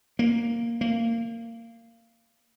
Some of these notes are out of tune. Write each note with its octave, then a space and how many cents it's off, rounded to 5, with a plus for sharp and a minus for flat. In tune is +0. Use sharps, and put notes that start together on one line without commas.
A#3 +0
A#3 -20